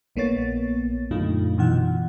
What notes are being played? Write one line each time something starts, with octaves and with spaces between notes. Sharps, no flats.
A#1 A#3 B3 C#5 A6
F#2 A#2 D3 A3 D#4 F4
F#2 B2 E3 D#4 F#5